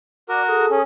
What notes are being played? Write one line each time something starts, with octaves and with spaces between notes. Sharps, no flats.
F#4 A#4 D5 D6
G#4 A4 D#6
C#4